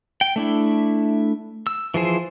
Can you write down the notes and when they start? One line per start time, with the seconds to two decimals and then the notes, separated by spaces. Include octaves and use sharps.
0.21 G5
0.36 A3 D4 E4
1.67 E6
1.94 E3 F3 G#4 C5